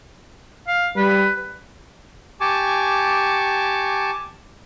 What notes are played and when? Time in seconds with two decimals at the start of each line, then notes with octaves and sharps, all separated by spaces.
0.68 F5
0.96 G3 B4
2.41 G4 G#5 A5 C#6 D6